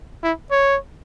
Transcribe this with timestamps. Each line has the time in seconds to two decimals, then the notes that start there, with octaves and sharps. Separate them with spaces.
0.24 E4
0.51 C#5